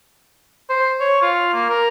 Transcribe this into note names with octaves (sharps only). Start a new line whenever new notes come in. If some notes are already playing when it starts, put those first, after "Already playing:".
C5
C#5
F4
A#3
A#4